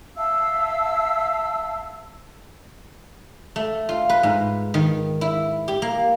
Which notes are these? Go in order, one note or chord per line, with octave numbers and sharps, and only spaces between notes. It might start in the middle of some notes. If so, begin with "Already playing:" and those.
E5 F5 A5 E6
A3
F4
B4
G#2
D#3
E4
G4
A#3